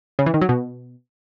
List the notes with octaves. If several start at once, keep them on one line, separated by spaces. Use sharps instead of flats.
C#3
E3
D#3
F#3
B2